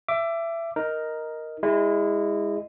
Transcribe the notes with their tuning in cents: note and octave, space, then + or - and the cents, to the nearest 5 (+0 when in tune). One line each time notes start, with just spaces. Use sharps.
E5 +20 D6 +0
D#4 +0 A#4 +0
G#3 -25 E4 -5